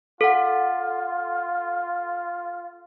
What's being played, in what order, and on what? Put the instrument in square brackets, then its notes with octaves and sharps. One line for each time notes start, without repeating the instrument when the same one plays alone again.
[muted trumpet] F4 [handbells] A4 F#5